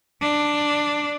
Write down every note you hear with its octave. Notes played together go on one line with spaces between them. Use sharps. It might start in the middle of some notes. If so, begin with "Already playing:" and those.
D4